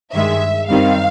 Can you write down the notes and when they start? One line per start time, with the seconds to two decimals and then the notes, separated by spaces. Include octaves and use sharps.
0.13 G2 D#3 G#3 E5
0.68 F#2 D#3 G3 C4 F5